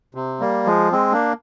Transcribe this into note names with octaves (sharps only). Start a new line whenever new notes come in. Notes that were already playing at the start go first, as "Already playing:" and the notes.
C3
G3 A#3
F3 G#3
G#3 C4
A#3 D4